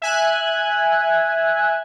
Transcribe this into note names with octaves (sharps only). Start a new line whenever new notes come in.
E5 G#5 F#6